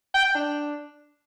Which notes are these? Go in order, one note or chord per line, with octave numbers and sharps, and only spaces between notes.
G5
G5
D4